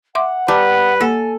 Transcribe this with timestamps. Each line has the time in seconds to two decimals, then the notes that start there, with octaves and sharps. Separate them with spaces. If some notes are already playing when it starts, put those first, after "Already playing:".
0.15 E5 F#5 C6 D6
0.48 G3 B4 A5 A#5 D6
1.01 A#3 A4 F#5 G#5